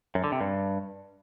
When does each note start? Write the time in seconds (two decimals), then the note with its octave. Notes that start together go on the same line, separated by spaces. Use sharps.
0.15 F#2
0.24 D3
0.32 C3
0.41 G2